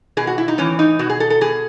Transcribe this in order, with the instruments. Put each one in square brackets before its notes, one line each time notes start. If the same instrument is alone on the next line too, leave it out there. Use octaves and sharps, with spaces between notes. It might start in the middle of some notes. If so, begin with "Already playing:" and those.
[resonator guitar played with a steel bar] B2 G#4
F#4
E4
D#4
A2 E3 C#4
D#4
B2 F#4
G#4
A4
A4
B2 G#4